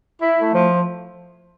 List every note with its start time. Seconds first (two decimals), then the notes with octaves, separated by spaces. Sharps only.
0.22 E4
0.38 A3
0.53 F3